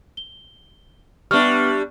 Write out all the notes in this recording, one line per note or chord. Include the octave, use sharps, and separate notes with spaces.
G7
G3 B3 D4 E5 C#6 F6